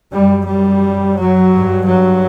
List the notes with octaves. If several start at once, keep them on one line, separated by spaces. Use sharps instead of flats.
F#2 G3
G3
F#3
G2
F#3